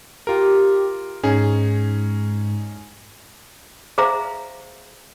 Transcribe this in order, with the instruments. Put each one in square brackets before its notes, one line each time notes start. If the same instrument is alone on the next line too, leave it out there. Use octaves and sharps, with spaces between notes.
[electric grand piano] F4 A#4 [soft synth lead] G4
[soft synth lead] G#2 [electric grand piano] C#4 D#4 G#4
[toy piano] G#4 C5 E5 F5 A#5